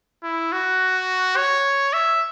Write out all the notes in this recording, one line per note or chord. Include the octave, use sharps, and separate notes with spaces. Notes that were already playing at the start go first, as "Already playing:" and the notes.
E4
F#4
C#5
E5